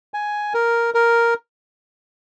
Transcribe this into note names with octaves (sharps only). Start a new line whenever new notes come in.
G#5
A#4
A#4